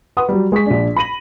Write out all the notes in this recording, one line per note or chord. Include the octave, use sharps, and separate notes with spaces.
B4 F#5 C6 D#6
F#3 G3
G#3 G#4 C#6 B6
A#1 D4
B5 A#6 D#7 F#7